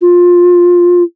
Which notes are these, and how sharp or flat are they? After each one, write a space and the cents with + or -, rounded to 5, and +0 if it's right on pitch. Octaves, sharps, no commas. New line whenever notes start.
F4 +15